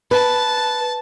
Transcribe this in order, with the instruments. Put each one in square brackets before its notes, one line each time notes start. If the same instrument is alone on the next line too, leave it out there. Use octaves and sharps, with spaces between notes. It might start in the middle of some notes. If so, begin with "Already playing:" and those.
[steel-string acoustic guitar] B4 [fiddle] A5